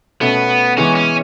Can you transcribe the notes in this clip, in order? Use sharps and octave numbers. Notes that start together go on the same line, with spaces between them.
B2 A3 B3 C#4
E3 G#3 B3 C#4
C#4